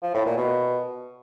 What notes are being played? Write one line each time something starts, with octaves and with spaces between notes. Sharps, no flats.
F3
A2
A#2
B2